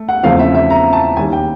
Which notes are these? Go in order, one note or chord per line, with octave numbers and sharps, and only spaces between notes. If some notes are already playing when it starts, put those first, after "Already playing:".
Already playing: A3
F#5
E2 C#3 F3 A3 C4 F5
E5
E5
A#5
A5
D#2 D#3 G3 G#5
G5